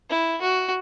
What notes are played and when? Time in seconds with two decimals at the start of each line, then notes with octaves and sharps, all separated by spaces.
0.10 E4
0.41 F#4